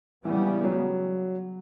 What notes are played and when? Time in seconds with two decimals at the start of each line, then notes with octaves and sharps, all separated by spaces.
0.25 C#3 E3 G3 B3
0.45 E3
0.64 F#3